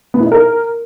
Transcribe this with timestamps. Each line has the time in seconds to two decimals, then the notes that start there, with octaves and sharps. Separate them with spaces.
0.14 B3
0.20 E4
0.26 D#4
0.32 A#4